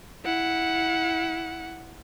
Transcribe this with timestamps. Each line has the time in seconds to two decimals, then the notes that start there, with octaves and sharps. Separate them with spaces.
0.24 E4 F#5